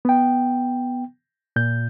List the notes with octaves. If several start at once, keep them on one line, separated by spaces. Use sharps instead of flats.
B3 G5
A#2 G6